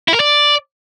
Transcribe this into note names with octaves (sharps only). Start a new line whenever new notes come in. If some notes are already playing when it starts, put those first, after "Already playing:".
E4
A#4
D5